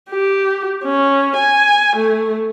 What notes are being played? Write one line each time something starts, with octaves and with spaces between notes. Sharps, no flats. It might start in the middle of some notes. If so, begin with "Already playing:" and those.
G4
C#4
G#5
A3